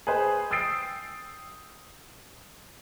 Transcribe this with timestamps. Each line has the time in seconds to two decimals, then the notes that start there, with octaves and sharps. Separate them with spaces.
0.07 G#4 B4 C5
0.51 G5 D#6 E6 A6 C7 D7